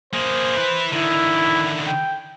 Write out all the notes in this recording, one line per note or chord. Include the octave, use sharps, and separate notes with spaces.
A#3 G#4 C5
E4 B4
D3 D#3 E4
G5